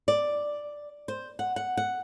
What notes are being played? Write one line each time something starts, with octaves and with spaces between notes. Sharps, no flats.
D5
C5
F#5
F#5
F#5